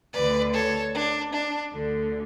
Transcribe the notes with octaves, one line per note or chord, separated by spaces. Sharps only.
D2 D3 B4 D5
A4 C#5
D4
D4
D2 D3